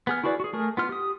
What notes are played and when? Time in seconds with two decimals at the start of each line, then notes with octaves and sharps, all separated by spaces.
0.07 B3 G#4 F6
0.24 E4 F#4 G#4 B4 D5
0.40 F#4 G#4
0.53 A3 G#4 A#4
0.77 B3 F4 F6
0.89 G4 D#6